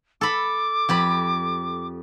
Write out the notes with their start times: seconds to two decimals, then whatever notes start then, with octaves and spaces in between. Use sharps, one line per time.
0.21 A4 B5 D6
0.89 F2 G4 B5